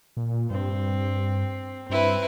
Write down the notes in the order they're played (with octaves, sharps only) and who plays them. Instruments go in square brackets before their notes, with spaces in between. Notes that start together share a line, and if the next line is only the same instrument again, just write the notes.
[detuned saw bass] A#2
[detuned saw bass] G2 [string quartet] C4
[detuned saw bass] G2 [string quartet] C4 E4 B4